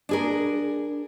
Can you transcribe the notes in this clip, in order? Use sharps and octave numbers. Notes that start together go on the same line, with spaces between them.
D4 G#4 A#4